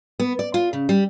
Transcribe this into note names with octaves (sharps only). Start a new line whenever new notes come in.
B3
D5
F4
C#3
G3